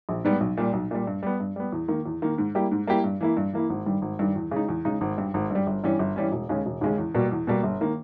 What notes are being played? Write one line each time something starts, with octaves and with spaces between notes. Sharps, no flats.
A#1
G#2 G3 B3
B1
A#2 G3
B1
A#2 G3
G2
G3 B3
G2
G3 B3
E2
D#3 A#3
E2
D#3 A#3
G#2
G3 A#3 E4 G4
G#2
G3 A#3 E4 G4
G2
E3 A#3 E4
G2
E3 A#3 E4
G#1
G2 D#3 G3
G#1
G2 D#3 G3
E2
C#3 G#3 D#4
E2
C#3 G#3 D#4
G#1
G2 G3
G#1
G2 G3
G1
G2 E3 G3 C#4
G1
G2 E3 G3 C#4
E1
D#2 C#3 G#3 C#4
E1
D#2 C#3 G#3 C#4
E2
B2 G3 A#3
E2
B2 G3 A#3
G1
D#3 A#3